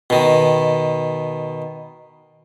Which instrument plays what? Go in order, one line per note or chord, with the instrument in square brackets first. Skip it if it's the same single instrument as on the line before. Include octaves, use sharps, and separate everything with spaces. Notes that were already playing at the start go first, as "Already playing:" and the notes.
[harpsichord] B2 D#3